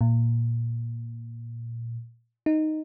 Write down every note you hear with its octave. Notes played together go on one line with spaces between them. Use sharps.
A#2
D#4